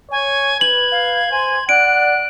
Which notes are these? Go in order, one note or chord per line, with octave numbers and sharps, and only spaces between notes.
C#5 G#5
B4 G#6 F#7
F5
C5 G#5
D5 F#5 F#6 D7